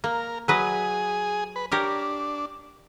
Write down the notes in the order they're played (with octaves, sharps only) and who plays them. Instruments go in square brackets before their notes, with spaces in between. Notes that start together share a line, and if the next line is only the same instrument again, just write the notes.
[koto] A#3 [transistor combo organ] A#4
[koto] F#3 B4 D#5 [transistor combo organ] G#4
[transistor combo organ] B4
[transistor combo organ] D4 [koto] G4 A#4 C#5